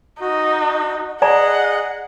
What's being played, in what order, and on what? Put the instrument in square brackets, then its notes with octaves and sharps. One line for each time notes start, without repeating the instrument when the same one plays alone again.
[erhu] D#4 [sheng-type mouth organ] F#4
[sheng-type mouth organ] G#4 D#5 [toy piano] D5 G#5 A#5 [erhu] F#5